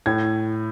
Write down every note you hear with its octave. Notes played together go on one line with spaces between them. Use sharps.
A2 G#6